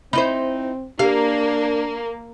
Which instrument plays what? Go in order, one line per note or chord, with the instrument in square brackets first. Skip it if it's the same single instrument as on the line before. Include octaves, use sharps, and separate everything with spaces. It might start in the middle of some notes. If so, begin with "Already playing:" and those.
[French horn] C4 [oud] D#4 E4 C5 [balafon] B5
[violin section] A#3 [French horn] D4 [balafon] G4 [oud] F5